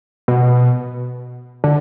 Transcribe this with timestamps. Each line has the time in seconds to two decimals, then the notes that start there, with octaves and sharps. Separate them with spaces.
0.28 B2
1.64 D3